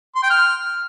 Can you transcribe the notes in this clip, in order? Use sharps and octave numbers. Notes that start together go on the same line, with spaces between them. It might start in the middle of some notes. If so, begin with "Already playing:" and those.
C6
G5
F6